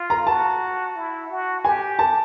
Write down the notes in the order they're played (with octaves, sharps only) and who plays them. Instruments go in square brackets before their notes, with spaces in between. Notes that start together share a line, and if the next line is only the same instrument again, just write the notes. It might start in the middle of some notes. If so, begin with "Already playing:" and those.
Already playing: [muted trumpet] F4
[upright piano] A#5
[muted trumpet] F#4 [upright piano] A5
[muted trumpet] E4
F#4
[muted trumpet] G4 [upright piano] G#5
[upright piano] A5